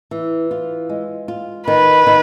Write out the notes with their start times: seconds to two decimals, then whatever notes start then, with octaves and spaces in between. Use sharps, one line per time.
0.11 E3
0.51 F4
0.89 G#3
1.28 F4
1.67 D#3 B4
2.07 D#3